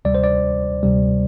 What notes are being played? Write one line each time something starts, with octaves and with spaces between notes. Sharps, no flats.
D2 C3 G3 D5
C5
D5
D2 C3 G3